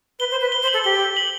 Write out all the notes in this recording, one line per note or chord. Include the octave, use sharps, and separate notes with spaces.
B4 G7
C5
B4
G7
C5
F#7
A4
G4 G7
F#7